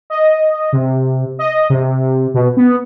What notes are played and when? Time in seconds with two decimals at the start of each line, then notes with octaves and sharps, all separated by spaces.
0.10 D#5
0.73 C3
1.39 D#5
1.70 C3
2.34 B2
2.57 B3